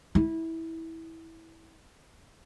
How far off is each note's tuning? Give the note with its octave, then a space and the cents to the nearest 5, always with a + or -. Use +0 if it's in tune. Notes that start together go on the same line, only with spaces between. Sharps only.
E4 -15